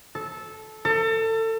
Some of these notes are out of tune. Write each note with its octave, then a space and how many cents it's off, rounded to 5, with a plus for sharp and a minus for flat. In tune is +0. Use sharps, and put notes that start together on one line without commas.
A4 -15
A4 +30